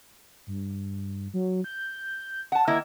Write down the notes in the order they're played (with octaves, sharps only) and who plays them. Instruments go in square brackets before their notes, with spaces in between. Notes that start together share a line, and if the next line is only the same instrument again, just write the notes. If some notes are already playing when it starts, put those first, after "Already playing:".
[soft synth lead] G2
F#3
G6
[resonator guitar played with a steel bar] F#5 A5
[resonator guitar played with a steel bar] D#3 A#3 E4 [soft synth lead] D#5